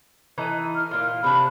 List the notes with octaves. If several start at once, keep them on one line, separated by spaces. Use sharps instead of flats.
E3 D#4 A4
F6
A#2 F4
C3 D4 B5